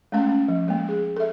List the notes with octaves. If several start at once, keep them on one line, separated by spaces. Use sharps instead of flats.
G#3 A3 C#4 F5
C#4
F3
G#3 A#3
G#4
A4 E5